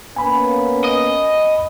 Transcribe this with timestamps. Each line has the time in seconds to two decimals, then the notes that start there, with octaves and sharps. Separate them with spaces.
0.16 A#3 B3 C#4 G#5 B5
0.84 D#5